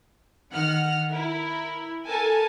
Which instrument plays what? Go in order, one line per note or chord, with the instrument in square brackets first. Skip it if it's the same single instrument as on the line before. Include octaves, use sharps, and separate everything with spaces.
[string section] D#3 F#5 F6
E4 A#4
A4 A#4 G#5 A5